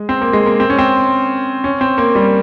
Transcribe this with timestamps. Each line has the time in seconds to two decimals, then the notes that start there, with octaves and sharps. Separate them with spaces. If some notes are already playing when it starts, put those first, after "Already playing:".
Already playing: G#3
0.09 C4
0.21 A#3
0.33 G#3
0.46 A#3
0.60 C4
0.70 C#4
0.79 C4
1.64 C#4
1.81 C4
1.98 A#3
2.15 G3